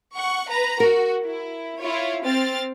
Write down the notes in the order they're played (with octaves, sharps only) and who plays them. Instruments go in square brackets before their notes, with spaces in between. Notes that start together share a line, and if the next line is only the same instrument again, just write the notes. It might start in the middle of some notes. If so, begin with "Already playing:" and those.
[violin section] F#5 C#6
B4 A#5
[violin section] F#4 [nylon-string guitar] A#4
[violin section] E4
E4 F4 C#5
C4 F6 A6